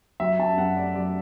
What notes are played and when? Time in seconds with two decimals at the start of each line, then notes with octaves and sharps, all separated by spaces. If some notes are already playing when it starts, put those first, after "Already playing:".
0.20 F#3 E5
0.39 F#2 A5
0.57 F#2 F#5
0.76 A3 D5
0.95 F#3 D5